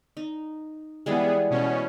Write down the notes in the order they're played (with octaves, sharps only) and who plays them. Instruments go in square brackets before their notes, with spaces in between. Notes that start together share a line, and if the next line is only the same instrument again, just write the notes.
[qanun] D#4
[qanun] E3 G3 G#3 [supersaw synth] B3 G#4
[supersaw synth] B2 C#4